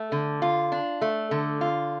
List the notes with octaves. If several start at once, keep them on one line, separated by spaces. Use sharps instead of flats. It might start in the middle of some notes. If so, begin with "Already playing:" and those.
Already playing: A3
D3
F4
D4
A3
D3
F4